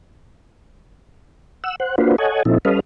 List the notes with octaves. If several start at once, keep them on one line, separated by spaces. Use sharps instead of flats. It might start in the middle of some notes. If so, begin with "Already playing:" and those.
F#5 E6
C5 F#5
A#3 D4 F4 F#4 B4 C5
A4 C#5 D#5 F#5 G#5
A#2 F3 C4 D#4 E4 A4
G3 C#4 A4 B4 D#5 F5